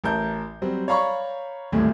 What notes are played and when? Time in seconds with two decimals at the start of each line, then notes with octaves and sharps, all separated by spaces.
0.04 A1 A#4 A5 G6
0.62 F#3 G3 C4
0.88 C#5 D5 F5 A#5 B5 C#6
1.72 D#1 G#1 D2 A2